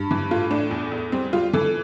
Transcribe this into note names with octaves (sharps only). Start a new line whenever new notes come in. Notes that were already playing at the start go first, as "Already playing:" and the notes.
Already playing: G2
E3
A2 F4
A2 D4
E2
E2
G3 C4
G3 F4
E3 A4